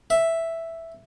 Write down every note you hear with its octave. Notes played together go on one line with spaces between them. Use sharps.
E5